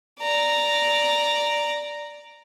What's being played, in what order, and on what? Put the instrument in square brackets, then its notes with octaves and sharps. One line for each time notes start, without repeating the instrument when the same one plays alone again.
[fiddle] D5 A#5